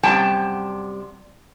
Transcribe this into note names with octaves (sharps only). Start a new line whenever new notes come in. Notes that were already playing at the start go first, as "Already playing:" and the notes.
F#2 C3 G3 G5 A5